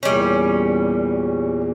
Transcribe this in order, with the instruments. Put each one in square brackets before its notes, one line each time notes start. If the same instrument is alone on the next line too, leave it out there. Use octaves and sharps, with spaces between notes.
[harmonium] E2 A#2 [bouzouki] G3 C#4